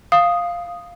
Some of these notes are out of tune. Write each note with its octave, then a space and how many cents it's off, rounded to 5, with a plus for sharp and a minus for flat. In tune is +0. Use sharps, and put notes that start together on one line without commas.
F5 +0 D#6 +0